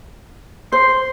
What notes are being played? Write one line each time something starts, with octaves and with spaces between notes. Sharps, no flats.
C5 C6